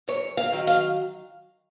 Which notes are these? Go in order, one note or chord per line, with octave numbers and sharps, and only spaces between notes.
F#2 C#5
F5
D#3 F#3
F5